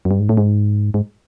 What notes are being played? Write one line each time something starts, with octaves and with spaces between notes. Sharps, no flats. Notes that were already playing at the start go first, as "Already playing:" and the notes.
F#2
G2
G#2
A2
G#2
G#2